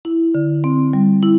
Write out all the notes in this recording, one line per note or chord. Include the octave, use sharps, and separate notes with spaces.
E4
D3
C4
G3
E4